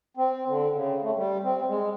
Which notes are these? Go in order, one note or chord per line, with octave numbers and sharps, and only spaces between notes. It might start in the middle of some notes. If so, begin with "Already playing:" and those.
C4
D3
C#3
A3
G3
C4
G#3